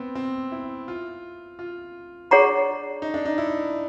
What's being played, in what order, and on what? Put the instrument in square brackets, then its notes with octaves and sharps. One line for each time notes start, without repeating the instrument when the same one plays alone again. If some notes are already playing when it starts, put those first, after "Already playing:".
Already playing: [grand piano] B3 C4
C4
E4
F4
F4
[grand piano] D4 [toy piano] G#4 C#5 F#5 A#5 C#6
[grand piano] D#4
D4
D#4
E4